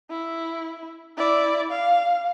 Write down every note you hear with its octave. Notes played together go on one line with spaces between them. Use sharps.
E4
E4 D5
F5